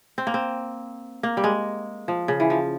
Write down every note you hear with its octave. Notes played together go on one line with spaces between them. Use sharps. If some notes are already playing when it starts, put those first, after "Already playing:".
C4
A#3
C4
A#3
G3
G#3
F3
C#3
E3
F3